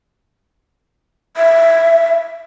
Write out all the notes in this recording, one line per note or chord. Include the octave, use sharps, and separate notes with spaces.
E5